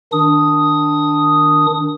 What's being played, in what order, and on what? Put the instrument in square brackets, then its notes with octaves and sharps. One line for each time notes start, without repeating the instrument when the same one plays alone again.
[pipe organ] D#3 D4 D#6